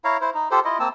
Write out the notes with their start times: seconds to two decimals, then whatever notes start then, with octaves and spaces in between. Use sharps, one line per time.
0.04 E4 C#5 F5 A#5
0.21 E4 C5
0.34 D#4
0.51 F4 G4 A4 C5
0.65 E4 F4 D#5
0.80 A#3 C4 A5 E6